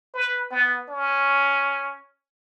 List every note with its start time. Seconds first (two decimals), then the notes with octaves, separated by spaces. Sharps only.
0.14 B4
0.51 B3
0.88 C#4